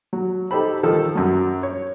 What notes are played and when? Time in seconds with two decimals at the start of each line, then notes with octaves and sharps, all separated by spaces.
0.13 F#3
0.51 D#4 G4 A4 C5 B5
0.83 D#3 F3 D#4 A4
1.15 F#2 F#3
1.63 C#5